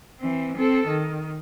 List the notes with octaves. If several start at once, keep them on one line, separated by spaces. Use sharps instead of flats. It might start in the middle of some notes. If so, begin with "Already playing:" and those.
E3 C4
C4 A4
D#3